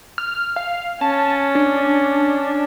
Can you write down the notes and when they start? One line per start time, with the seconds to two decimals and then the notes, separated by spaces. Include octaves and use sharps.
0.18 F6
0.56 F5
1.01 C#4 A5
1.55 D4